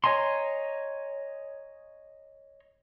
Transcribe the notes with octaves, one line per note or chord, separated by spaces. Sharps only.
C#5 D#5 G#5 A#5 C6